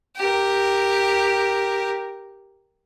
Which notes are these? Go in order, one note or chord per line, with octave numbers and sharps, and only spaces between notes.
G4 A#4